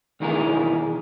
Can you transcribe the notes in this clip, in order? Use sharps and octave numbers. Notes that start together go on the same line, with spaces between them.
B1 E2 D#3 E4 G#4 A#4